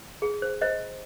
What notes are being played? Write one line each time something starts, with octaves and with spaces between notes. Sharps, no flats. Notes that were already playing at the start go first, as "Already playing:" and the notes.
G#4
C5
C5 D#5